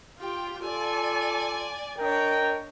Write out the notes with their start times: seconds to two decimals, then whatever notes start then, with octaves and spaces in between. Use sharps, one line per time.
0.18 F4 G4 G5
0.62 F4 A4 D5 G#5
1.99 D4 A#4 C#5 D#5 G5